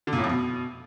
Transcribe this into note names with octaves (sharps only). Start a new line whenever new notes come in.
D3
A#2
A2
F2
B2